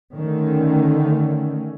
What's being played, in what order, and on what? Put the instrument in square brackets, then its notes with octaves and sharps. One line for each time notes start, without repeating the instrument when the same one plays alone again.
[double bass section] D3 D#3 A3 C#4